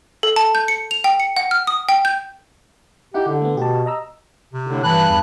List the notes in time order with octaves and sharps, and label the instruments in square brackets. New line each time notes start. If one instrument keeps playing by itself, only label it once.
[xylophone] A4
A5
G6
C#7
F7
G5
C#7
F#5
F6
D#6
G5
G6
[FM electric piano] D#4 E4 F#5 [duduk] G4
[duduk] D3
[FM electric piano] A3 B3
[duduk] B2 [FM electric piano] G4 A5
[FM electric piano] D#5 A#5 E6
[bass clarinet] C3
[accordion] A2 D3
[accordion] G2 F#6 [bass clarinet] E3 [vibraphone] A5 B5
[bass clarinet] E2